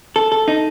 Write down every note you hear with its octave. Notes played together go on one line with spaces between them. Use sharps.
A4
A4
D#4